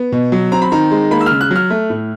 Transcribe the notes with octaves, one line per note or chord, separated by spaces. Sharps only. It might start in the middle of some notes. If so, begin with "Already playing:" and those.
Already playing: B3
B2
F#3
C4 A#5
B5
D#3 A#5
G#3
A#3 B5
E6
C#3 F6
F#6
F#3
F6
A3
A2